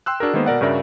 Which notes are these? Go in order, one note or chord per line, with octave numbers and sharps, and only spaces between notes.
G5 C6 E6 F#6
D4 F#4 G#4 A#4
D#3 G#3 A#3 B3 C5
B2 A#4 D5 F#5
G2 C#3 F#4 A#4 D5 E5